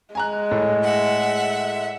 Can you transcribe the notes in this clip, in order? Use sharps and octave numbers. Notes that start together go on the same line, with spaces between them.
G#3 G#5 A#5 F#6
A2
E5 F#5